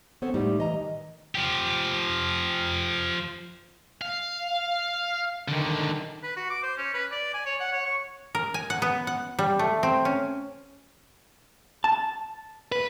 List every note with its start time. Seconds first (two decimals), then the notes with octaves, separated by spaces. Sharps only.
0.22 B3 C4 A4 C5 C#5
0.34 A2 G3 G#3 D#4
0.58 E3 D#5 A#5
0.81 D#3
1.35 F3 G4
4.01 F5
5.48 D3 D#3
6.23 B4
6.36 F#4
6.50 D6
6.63 C5
6.78 C#4
6.94 B4
7.11 D5
7.34 G#5
7.46 C#5
7.60 F#5
7.72 C#5
7.86 C#6
8.35 A#4
8.54 G#5
8.70 F#5
8.82 B3
9.07 F#5
9.39 G3
9.59 A3
9.83 C4
10.05 C#4
11.84 A5
12.72 B4